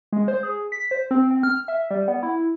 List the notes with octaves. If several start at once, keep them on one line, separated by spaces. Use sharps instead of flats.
G#3
C5
G#4
B6
C5
C4
C4
F6
E5
G3
B3
E4